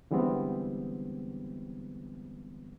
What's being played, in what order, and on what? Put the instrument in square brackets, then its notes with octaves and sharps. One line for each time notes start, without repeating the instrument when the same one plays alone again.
[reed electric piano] D3 E3 G3 G#3 B3 C4